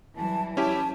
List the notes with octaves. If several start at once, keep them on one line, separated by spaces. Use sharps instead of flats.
E3 F#3 G3 A5
C#4 E4 G4 A5